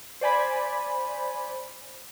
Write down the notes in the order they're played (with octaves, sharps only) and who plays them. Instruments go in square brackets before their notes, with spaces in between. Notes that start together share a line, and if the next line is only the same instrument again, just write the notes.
[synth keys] C5 D5 G#5 B5